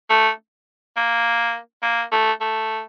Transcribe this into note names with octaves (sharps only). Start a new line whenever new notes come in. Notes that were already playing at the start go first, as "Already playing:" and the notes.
A3
A#3
A#3
A3
A3